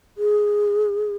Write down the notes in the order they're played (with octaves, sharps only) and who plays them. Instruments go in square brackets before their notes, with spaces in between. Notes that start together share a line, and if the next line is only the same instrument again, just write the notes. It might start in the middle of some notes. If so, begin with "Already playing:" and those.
[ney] G#4